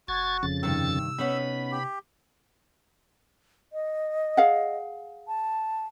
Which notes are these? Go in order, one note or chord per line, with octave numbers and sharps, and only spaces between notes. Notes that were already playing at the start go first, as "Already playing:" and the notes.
F1 F#4 G#6 A6
F2 C#3 A6
G2 C3 D#3 E6
B3 C#4 D#4 B5
G4
D#5
G#4 F5 F#5
A5